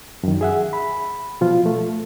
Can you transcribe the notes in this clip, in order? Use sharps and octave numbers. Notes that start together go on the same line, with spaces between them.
F#2 D#3
G#4 E5 F#5
B5
B2 F3 F4
A3